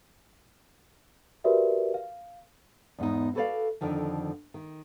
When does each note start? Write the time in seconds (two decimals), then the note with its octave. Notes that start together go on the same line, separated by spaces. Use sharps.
1.44 F#4 G4 A#4 B4 D5 E5
1.94 F5
2.98 E2 G#2 B3 D#4
3.35 F#4 A4 B4 C5 D5 F5
3.81 F2 D3 D#3 F3
4.54 D#3